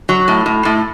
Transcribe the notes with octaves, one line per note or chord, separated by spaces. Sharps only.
F#3
A2
A2
A2